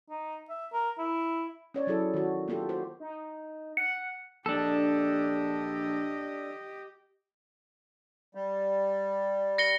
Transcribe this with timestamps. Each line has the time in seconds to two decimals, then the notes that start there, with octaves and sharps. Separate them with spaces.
0.09 D#4
0.49 E5
0.73 A#4
0.98 E4
1.74 C#4 C#5 D5
1.87 F#3 C#4 E4 G#4 A4
2.14 D#3 F#4
2.48 A#3 B3 F4 G4 A4
2.69 F#4 C5
3.00 D#4
3.77 F#5 C#7
4.46 A#1 D4 G4 A4 D#5
8.35 G3
9.58 A#6 C#7 G7